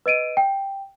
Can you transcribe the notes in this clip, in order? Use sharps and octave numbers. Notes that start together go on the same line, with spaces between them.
B4 D#5 D7 D#7
G5